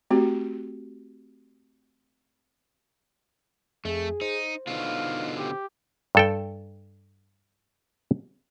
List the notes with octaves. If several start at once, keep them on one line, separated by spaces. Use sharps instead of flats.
A3 C4 F#4 G4
F2 A3 G#4
D#4 C5
B2 D3 D#4 F4 F5
G4
G2 A4 G5